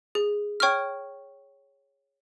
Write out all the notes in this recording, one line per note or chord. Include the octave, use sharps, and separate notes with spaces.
G#4
C#5 G5 C#6 F6